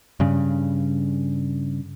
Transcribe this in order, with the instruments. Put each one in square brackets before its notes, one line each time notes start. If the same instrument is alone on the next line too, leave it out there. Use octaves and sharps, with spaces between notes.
[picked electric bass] G2 C#3